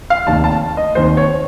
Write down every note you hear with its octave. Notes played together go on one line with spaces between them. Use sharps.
F5
F1 D#2 D#3 A5
A5
D#5
F1 D#2 D#3 C5
C#5